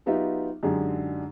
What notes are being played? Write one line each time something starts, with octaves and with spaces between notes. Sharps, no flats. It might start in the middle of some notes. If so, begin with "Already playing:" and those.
F#3 B3 D#4 F4 G4 E5
F#2 D3 G#3 D#4 G4 G#4